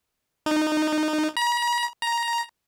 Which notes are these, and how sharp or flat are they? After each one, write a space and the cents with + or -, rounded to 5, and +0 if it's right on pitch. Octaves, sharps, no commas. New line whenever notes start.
D#4 -20
A#5 +45
A#5 +10